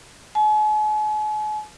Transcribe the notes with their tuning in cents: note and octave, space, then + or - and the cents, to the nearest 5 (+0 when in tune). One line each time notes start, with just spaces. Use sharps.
G#5 +45